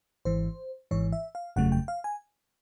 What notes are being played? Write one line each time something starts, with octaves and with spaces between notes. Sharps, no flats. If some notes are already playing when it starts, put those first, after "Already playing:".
G#1 G#2 E3 C5
G#1 G#2 E3 C#5
E5
F5
G1 F2 C#3 F#3 A3 F#5
G5
F5
G#5